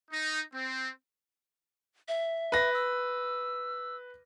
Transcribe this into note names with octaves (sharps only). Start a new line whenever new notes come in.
D#4
C4
E5
B4 A#6
E6